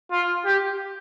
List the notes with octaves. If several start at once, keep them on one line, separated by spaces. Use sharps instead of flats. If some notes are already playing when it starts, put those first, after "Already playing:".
F4
G4